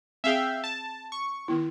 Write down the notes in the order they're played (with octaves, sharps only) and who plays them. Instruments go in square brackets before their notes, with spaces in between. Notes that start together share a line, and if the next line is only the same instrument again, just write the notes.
[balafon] C4 G#4 [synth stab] E5 F5 G5
[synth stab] A5
C#6
[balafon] D#3 B3 E4